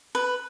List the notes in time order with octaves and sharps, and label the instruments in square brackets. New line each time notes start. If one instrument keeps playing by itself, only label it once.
[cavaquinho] B4